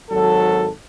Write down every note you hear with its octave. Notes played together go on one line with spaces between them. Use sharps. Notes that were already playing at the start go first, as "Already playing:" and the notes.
G#1 F#3 A4